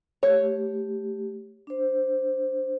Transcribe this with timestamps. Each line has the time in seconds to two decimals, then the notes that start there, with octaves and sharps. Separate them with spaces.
0.23 A3 G4 C#5
1.67 D4 C5